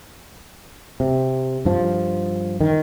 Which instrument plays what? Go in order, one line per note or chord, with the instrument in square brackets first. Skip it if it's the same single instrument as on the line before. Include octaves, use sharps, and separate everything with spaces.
[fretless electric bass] C3
G2 F3
D#3